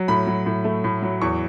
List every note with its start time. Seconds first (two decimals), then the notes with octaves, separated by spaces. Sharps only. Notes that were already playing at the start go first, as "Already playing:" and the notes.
Already playing: F#3
0.08 A2 B5
0.27 F#3
0.46 A2
0.64 A3
0.84 A2
1.03 F#3
1.22 E2 C#6